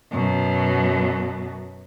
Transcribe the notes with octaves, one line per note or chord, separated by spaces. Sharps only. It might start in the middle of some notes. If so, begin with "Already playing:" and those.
F#2 B2